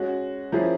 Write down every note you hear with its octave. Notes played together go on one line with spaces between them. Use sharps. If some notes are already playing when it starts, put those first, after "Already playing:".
Already playing: G#3 C#4 F#4
F3 A#3 C#4 E4 G#4